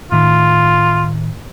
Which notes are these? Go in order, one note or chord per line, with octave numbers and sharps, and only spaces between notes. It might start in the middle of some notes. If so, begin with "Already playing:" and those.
A2 D#3 F4